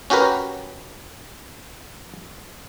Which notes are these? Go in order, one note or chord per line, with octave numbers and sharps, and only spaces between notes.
C#4 F#4 G4 A#4 B4